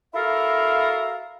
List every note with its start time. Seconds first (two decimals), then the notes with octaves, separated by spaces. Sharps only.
0.14 E4 F#4 A4 A#4 F5